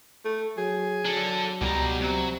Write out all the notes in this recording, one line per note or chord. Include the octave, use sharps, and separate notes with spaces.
A3
F#3 G#4
F#3 D4 A4
C#2 B2 G3 A#5
C3 F#3